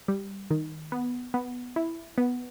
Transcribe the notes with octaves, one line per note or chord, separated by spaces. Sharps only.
G3
D#3
B3
B3
E4
B3